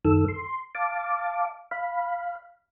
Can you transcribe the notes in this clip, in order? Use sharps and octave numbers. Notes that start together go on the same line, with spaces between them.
F#2 D#3 A4 E6
C6
F5 A5 D6
F5 B5